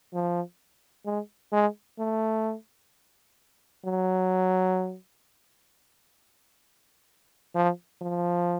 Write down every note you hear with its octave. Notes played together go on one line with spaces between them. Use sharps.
F3
G#3
G#3
A3
F#3
F3
F3